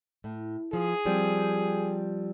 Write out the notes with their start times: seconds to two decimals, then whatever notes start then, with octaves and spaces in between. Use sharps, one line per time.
0.24 A2
0.73 F3 G#4
1.05 F3 G3 C4